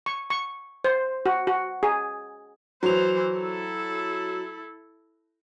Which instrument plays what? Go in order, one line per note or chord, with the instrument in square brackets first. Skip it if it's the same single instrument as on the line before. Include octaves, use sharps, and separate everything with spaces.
[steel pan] C#6
C#6
C5
F#4
F#4
G#4
[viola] E3 C5 [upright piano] F#3 F7
[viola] E4 A4